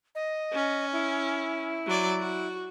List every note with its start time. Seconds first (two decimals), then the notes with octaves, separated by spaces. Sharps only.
0.15 D#5
0.53 C#4
0.93 E4
1.87 F#3 D5
2.20 F#4